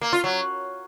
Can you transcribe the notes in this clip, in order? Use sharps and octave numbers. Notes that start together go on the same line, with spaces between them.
A#3
F4
F#3